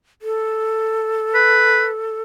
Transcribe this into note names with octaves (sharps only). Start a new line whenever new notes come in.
A4
B4